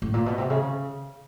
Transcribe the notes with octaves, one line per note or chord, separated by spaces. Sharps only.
A2
A#2
B2
C3
C#3